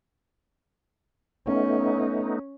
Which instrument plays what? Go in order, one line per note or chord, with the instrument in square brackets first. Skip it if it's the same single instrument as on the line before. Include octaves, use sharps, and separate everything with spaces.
[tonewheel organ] A3 B3 D#4 [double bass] C#4